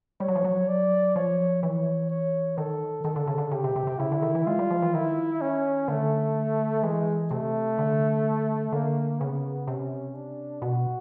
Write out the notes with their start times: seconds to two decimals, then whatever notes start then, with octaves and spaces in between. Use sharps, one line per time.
0.20 G3 C#5
0.28 F#3
0.35 F3
0.44 F#3
0.68 D5
1.15 F3 C#5
1.63 E3 C#5
2.10 C#5
2.57 D#3 A4
3.04 D#3 A4
3.16 D3
3.27 C#3
3.38 D3
3.51 C#3 G4
3.64 C3
3.76 C3
3.87 C3
3.99 C#3 E4
4.12 D3
4.22 D#3
4.35 E3
4.47 G#3 F4
4.59 G3
4.71 F3
4.82 E3
4.94 D#3 E4
5.41 C#4
5.88 D3 A3
6.83 E3 G#3
7.31 C3 A3
7.79 D3
8.73 D3 A#3
9.20 C#3 B3
9.67 C3 C#4
10.15 D4
10.62 B2 F#4